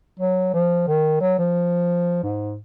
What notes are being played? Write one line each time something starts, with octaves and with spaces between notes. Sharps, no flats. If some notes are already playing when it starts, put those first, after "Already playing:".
F#3
F3
D#3
F#3
F3
G#2